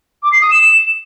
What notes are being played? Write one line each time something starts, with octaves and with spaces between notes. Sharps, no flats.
D6
C7
D#6
E7